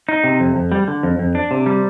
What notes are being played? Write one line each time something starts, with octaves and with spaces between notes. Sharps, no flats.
D#4
C3
F2
F2
G3
D3
F2
F2
D4
C3
G3